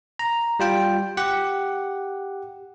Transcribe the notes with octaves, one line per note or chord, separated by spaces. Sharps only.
A#5
G3 F4 G5
G4 F#5